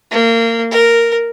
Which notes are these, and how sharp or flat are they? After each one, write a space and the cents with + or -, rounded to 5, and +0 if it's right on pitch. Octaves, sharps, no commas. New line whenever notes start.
A#3 -25
A#4 -5